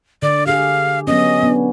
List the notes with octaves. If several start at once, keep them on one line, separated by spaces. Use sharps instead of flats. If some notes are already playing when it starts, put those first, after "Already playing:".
D3 D5
G4 G#4 F5
F#3 B3 C#4 D#5
B3 D4